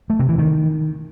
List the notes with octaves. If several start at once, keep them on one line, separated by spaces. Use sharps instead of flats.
A3
C3
E3
D#3